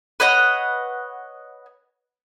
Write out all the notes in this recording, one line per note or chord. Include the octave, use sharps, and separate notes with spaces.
B4 C#5 D#5 F#5